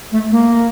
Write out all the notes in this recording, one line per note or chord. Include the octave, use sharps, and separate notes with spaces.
A3
A#3